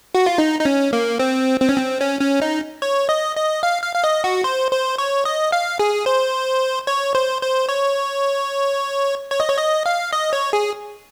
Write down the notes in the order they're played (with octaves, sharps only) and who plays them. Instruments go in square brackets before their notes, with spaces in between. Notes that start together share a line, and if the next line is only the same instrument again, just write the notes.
[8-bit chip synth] F#4
F4
D#4
D#4
C#4
A#3
C4
C4
C#4
C4
C#4
C#4
D#4
C#5
D#5
D#5
F5
F5
F5
D#5
F#4
C5
C5
C#5
D#5
F5
G#4
C5
C#5
C5
C5
C#5
C#5
D#5
C#5
D#5
F5
D#5
C#5
G#4